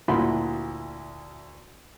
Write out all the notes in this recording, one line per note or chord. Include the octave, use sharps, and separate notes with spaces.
D2 A#2 E4 F#4 B5 C6